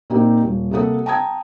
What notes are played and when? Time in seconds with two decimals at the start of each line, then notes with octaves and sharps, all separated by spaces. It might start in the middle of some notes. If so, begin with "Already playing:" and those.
0.10 A#2 A#3 C4 D#4 G4
0.43 D#1
0.71 C3 A#3 A4 F#5 D#6
1.06 G5 A5 A#5 D#6 G#6